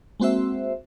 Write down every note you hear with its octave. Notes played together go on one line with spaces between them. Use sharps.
G#3 A#3 C4 F#4 C5 E5